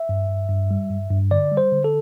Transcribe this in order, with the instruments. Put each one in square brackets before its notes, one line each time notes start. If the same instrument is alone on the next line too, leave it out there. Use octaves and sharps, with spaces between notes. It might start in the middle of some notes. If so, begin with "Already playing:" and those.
Already playing: [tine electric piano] E5
G2
G2
G2
G3
G2
G2
D3 D5
G3
C5
D3
A4